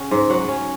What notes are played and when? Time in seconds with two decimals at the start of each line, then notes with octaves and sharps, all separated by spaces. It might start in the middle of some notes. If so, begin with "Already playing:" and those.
Already playing: C#3 C#4 F#5
0.11 G#2
0.30 F#3 F#5
0.48 C#4